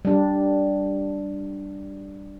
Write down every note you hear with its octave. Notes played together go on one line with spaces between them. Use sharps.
G3 D4